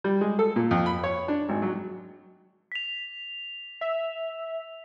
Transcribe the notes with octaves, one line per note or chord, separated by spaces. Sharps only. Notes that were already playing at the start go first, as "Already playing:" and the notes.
G3
G#3
A4
A#2
F2
B5
C#5
D4
G#1
F#3
B6 F7
E5